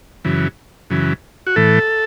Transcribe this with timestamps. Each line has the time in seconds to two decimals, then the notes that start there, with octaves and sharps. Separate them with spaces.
0.25 F#2 C#3 E3
0.90 F#2 C#3 E3
1.47 F#4
1.56 A2 E3 A4